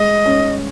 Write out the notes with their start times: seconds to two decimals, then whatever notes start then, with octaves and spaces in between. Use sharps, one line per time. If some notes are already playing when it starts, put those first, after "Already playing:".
Already playing: G#3 D#5
0.26 C#4